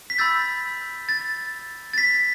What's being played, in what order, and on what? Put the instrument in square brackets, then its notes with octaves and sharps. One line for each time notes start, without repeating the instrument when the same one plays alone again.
[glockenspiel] B6
B5 E6 G6 A6
A6
A6
B6